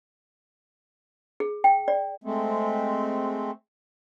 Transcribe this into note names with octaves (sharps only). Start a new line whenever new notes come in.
G#4
G5
D5
G#3 A3 C4